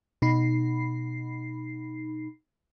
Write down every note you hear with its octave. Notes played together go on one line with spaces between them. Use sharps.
B2 D#4 B5 C7